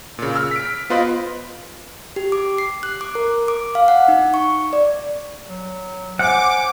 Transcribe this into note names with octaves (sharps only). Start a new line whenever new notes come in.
A#2 C#3
E6 F6
B6 D7
B6
B3 F4 B4 C5 D#5 B5
G4
D6
C7
F#6
D6
A#4
D6
F5
F#5
D#4
C#6
D5
F#3
C5 F#5 G#5 D6